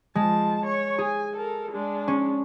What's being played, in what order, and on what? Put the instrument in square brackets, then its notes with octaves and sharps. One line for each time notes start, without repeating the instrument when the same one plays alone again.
[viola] F3 A5 [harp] G#3
[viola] C#5 C#6
[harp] G#4 [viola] G#5
[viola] A4 A#4
G#3 D4
[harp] C#4